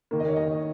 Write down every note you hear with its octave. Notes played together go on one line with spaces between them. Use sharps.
D#3 A#3
D#5
C#5
D#5